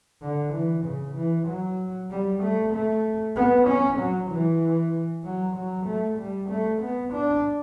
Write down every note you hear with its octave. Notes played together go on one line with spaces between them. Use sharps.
D3
E3
C#3
E3
F#3
G3
A3
A3
B3
C#4
F#3
E3
F#3
F#3
A3
G3
A3
B3
D4